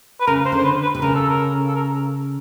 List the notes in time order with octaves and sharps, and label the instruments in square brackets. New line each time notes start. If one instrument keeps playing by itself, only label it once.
[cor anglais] B4
[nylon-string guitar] C#3 [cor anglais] A#4
[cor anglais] C5
[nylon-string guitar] D3
[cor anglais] C5
B4
B4
[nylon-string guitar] C3
[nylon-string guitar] C#3 [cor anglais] A#4
[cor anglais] A4
A#4
A4
A#4